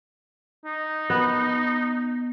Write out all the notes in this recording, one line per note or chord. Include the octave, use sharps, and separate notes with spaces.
D#4
B3